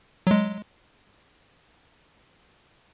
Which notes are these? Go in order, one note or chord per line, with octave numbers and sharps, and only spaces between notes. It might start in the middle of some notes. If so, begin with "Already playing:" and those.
F#3 G#3